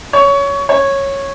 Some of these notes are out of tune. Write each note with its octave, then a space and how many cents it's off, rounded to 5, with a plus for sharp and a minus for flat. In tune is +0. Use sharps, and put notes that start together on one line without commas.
C#5 +20
C#5 -10